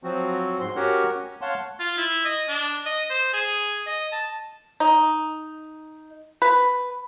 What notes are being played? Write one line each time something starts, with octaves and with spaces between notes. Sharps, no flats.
F3 F#3 C4 F#4
G#2 C6
C#4 F#4 G4 A#4 C#5 F#5
C#4
C#5 F5 F#5 A5 C6
F4
E4
D#5
D4
D#5
C5
G#4
D#5
A5
D#4
B4